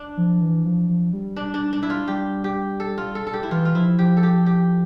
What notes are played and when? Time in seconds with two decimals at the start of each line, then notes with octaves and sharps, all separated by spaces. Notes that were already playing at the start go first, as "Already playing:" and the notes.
Already playing: D4
0.17 F3
0.41 E3
0.65 F3
0.88 F3
1.13 G3
1.36 D4
1.54 D4
1.73 D4
1.83 E4
1.90 F4
2.08 G3 G4
2.44 G4
2.80 A4
2.98 F4
3.15 A4
3.27 A4
3.33 G4
3.43 E4
3.51 E3 F4
3.65 F4
3.75 F3 E4
3.99 F3 G4
4.17 A4
4.23 G4
4.46 G4